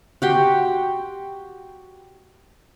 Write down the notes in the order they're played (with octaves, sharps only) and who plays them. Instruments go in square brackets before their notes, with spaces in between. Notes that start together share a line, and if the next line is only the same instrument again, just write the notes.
[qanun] F#4 G4 C6